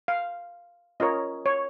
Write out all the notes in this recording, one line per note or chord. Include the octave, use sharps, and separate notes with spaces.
F5
C#4 F4 A#4 C#5 D#5
C#5